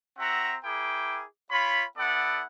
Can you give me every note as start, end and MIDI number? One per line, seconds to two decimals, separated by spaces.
0.19 0.55 60
0.19 0.55 66
0.19 0.55 76
0.19 0.55 78
0.19 0.55 82
0.64 1.24 64
0.64 1.24 68
0.64 1.24 70
0.64 1.24 79
0.64 1.24 86
1.51 1.84 65
1.51 1.84 73
1.51 1.84 83
1.98 2.43 59
1.98 2.43 64
1.98 2.43 69
1.98 2.43 74
1.98 2.43 78